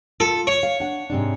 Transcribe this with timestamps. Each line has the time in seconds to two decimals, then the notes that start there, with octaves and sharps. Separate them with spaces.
0.20 F4 A4
0.47 C#5
0.63 F5
0.80 D4 F#5
1.10 G#2 C3 D4